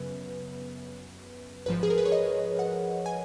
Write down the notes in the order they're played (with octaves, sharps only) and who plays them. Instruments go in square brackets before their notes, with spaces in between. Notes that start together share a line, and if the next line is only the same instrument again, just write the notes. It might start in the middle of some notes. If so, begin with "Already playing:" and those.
Already playing: [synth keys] F#2 C#3 F#3 B3 B4
G#1 G#2 F3 B4
G#4
A#4
B4
C#5
D#5
F#5
G#5